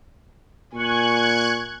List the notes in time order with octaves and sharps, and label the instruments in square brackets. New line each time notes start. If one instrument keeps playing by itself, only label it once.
[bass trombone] A#2 [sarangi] G#5 [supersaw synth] C#6 F#6 G#6